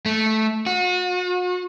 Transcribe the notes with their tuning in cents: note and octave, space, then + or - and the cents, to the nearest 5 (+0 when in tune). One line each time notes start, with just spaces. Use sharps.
A3 -10
F#4 -40